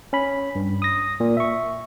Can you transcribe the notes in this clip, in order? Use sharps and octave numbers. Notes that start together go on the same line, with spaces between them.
C#4 B5
G2
D#6 A#6
A#2
E5 C#6